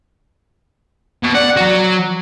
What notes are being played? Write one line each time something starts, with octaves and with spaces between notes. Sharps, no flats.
B2
D5 F#5
F#3 F#4